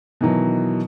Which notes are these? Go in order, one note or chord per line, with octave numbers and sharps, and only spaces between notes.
B2 D#3 E3 F#3